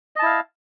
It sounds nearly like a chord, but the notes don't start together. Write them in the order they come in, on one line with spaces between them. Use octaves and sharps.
D#5 A5 E4 F5